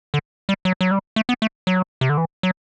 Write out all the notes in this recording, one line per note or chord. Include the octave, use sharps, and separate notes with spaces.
D3
G3
F#3
F#3
G3
A3
B3
A3
F#3
C3
D3
E3
F#3